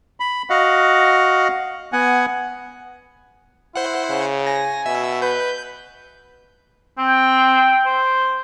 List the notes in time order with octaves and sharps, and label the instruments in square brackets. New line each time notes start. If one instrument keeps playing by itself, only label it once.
[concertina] B5
F#4 D#5 F5 F#5
B3 F#5 G#5
[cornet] E4 [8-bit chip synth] C5 F#5
[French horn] C#3
[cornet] G#5 [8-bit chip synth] A#6
[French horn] B2 [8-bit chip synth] E5
[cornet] B4 [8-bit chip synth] G6
[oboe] C4 [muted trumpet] G5
[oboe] C5